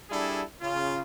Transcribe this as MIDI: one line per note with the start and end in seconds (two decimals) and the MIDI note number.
0.10 0.42 55
0.10 0.42 62
0.10 0.42 64
0.10 0.42 68
0.10 0.42 69
0.61 1.01 49
0.61 1.01 65